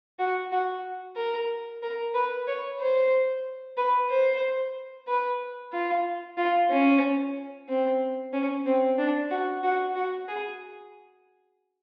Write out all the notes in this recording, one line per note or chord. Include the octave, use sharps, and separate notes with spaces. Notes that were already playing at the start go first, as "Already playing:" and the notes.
F#4
F#4
A#4
A#4
B4
C#5
C5
B4
C5
B4
F4
F4
C#4
C4
C#4
C4
D4
F#4
F#4
F#4
G#4